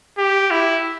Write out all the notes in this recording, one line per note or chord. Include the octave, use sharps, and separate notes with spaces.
G4
E4